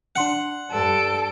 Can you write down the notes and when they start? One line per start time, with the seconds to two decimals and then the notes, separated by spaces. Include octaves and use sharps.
0.16 D4 F#5 C6 C#7
0.71 G2 G3 A4 D7